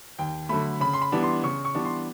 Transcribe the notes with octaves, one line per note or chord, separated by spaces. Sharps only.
D#2 G5
D3 F#3 A3 B5
C#3 B5
C6
B5
E3 G3 B3 D4
C6
C#3 C#6
C#6
E3 G3 B3 D4
C6